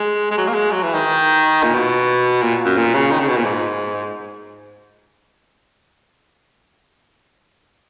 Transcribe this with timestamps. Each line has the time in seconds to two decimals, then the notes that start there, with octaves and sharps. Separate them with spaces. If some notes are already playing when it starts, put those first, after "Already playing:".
Already playing: G#3
0.31 G#3
0.37 F#3
0.48 A#3
0.54 G#3
0.72 F#3
0.83 E3
0.94 D#3
1.63 A#2
1.74 B2
2.42 A#2
2.65 F#2
2.77 A#2
2.94 C#3
3.12 D#3
3.20 C#3
3.28 B2
3.37 A#2
3.46 G#2